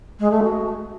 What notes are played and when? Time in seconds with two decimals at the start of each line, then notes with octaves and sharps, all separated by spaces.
0.19 G#3
0.31 A3
0.42 F#4